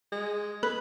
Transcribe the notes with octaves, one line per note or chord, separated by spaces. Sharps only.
G#3
B4